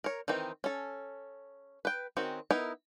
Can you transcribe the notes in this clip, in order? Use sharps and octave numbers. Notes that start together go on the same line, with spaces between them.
A#4 C#5
D#3 E3 C4 D#4
C#4 A4
B4 G5
D#3 C4 C#4 F#4
B3 D#4 E4 A#4